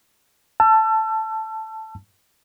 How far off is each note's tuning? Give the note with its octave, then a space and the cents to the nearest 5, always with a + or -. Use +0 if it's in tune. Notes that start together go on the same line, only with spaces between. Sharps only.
A5 +0 E6 +35